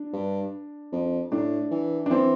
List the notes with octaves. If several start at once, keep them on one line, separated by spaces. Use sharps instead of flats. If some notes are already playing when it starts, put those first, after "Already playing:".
Already playing: D4
G2
F2
A2 D4
E3
D4
E3 C4